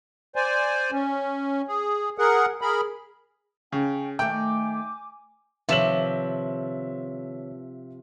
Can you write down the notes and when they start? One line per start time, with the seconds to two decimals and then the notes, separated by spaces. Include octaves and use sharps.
0.36 C5 D5 G#5
0.92 C#4
1.68 G#4
2.18 G#4 A#4 F#5
2.62 G#4 A#4 B5
3.72 C#3 C#4 G5
4.19 D#3 A3 G5 G#5 D6
5.69 C3 D#3 F3 B4 C#5 E5 E7 F#7